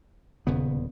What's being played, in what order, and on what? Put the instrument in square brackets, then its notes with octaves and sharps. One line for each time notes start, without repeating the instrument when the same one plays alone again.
[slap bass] D#1 E2 B3 [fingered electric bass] C#3